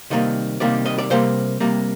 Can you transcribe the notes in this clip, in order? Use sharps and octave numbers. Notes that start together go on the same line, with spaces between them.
C3 D#3 G3 A#3 D#5
C3 D#3 G3 A#3 D5
D#5
D5
C3 G3 A#3 C5
C3 G3 A#3